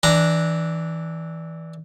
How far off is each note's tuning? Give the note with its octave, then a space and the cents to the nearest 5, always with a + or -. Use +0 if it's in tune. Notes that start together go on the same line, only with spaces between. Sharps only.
E3 -15 D4 +0 A#5 +0